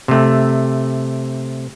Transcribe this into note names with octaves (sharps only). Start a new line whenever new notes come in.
C3 A3